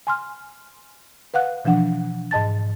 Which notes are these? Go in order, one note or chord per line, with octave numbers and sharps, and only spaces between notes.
G#5 C6 F6
B4 F5 F#5 F#6
B2 E3 F3 D4 F#5
G#2 D#5 A5 A6